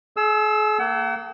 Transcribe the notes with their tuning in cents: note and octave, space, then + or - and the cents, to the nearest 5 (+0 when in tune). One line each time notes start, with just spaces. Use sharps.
G#4 +40 E6 +0
A#3 -20 F#5 +40